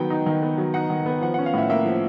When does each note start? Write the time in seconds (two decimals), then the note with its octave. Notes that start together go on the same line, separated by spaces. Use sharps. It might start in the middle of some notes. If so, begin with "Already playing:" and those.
Already playing: D#3 F#3 B3 D#4 F#5 G5
0.10 D#4
0.26 D#3
0.42 B3
0.58 F#3
0.74 D#4 F#5
0.90 D#3
1.06 B3
1.21 F3 F#5
1.34 C#4 F#5
1.46 F5
1.53 A2 E5
1.70 A#3 E5
1.85 F3